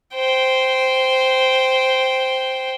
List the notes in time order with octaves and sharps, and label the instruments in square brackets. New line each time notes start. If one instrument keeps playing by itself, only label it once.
[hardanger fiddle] C5 G5